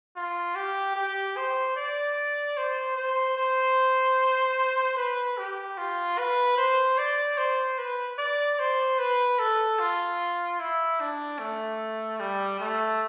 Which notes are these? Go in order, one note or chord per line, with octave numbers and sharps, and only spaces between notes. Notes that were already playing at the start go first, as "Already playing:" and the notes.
F4
G4
G4
C5
D5
C5
C5
C5
B4
G4
F4
B4
C5
D5
C5
B4
D5
C5
B4
A4
F4
E4
D4
A3
G3
A3